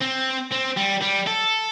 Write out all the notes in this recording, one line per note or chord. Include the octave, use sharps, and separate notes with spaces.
C4
C4
G3
G3
A4